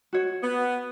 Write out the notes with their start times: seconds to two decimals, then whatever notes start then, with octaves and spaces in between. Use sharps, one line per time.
0.13 F#4 C#5
0.42 B3